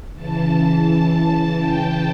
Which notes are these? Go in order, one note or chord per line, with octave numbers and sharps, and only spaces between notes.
C#3 E3 A5
G5